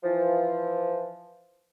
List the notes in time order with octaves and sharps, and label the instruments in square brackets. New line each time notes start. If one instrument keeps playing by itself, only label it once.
[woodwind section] E3 F3